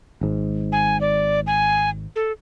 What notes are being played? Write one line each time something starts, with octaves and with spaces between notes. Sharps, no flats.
G#1 G#2
G#5
D5
G#5
A4